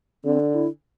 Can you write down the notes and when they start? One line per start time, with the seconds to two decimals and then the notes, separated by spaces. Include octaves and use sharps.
0.24 D3 C4
0.40 D4
0.54 E4